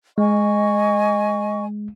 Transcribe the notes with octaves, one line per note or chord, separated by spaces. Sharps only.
G#3 D#5 G#5 C#6